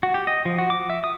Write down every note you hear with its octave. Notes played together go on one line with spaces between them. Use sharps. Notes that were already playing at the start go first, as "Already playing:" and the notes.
F#4
G4
D#5
F3
F#4
D6
E5
D#6